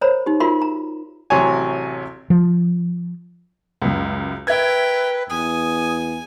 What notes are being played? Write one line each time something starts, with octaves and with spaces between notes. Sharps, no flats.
A#4 C5 C#5 A#5 B5
D#4 G4
F4 F#4 A#4 E5 B5 C6
A#5
A1 C3 F#3 C#5 G#5
F3
C#2 F#2
A#4 B4 E5 G5 G#6
E2 G#5 D#6